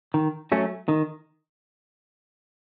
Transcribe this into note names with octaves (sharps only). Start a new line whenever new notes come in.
D#3
F#3 A3 C#4
D#3